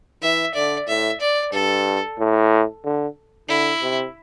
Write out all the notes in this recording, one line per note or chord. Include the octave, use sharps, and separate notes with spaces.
E3 E5
D3 D5
A2 E5
D5
G2 A4
A2
D3
D3 E4
C3